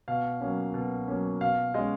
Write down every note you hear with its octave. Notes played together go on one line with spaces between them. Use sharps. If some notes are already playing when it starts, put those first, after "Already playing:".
B2 F5
F#3 A#3 C#4
B2
F#3 A#3 C#4
B2 F5
G#3 C#4 D#5